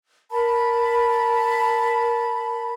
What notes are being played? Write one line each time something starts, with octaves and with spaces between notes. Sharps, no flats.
A#4 A5 B5